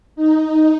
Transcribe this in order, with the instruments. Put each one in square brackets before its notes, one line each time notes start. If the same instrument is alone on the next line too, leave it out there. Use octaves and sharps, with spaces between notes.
[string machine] D#4